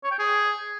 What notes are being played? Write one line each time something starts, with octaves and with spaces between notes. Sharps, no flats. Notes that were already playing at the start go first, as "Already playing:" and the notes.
C#5
G5
G#4